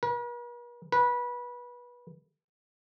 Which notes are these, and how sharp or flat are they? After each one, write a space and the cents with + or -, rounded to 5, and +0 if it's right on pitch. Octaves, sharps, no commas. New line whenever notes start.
B4 -45
B4 -20